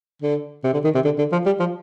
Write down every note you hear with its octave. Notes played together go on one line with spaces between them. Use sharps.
D3
C3
D3
D#3
C3
D3
D3
F3
G3
F3